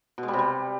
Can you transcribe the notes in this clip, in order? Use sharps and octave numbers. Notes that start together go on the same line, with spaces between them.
B2
G#3
G3
C3
G3